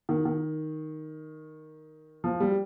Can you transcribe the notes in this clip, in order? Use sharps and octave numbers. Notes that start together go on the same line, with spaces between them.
D#3
D#3
F3
G3